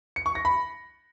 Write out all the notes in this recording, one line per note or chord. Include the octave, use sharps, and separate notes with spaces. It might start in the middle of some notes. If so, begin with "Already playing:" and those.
C#7
C#6
A#6
B5